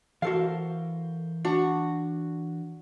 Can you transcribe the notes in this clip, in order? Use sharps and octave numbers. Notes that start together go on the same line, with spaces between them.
E3 F#4 A4 A#4 C5 F5
D4 F#4